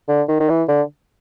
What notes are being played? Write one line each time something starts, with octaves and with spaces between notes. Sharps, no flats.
D3
D#3
D#3
E3
D3